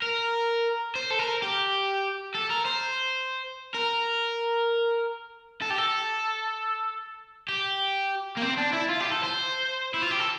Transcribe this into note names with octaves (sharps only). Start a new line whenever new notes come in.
A#4
C5
A4
A#4
G4
A4
A#4
C5
A#4
A4
G4
A4
G4
A#3
C4
D4
E4
F4
G4
A4
C5
E4
F4
G4
A4